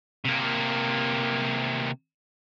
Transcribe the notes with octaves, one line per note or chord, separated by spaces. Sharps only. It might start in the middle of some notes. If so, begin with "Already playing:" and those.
C3 A#3